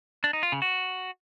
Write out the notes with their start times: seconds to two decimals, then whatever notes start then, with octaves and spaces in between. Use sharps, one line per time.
0.24 D4
0.33 D#4
0.43 F4
0.52 C#3
0.62 F#4